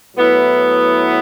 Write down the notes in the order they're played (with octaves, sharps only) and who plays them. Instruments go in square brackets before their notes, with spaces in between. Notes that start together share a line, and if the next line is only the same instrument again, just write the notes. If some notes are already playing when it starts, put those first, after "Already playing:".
[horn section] A2 F#3 B3 E4